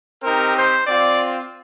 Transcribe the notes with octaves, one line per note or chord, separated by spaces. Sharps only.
C4 D#4 G4 A#4
C5
C4 F4 D5